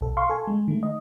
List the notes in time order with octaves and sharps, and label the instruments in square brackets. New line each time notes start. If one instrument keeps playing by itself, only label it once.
[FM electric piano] B1 A4
F5 C6 C#6
A4 G#5
G#3
D#3 A3
D#5